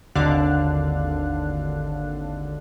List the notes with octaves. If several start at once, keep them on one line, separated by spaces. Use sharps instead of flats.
G#1 D#2 D3 D4 F5 F#6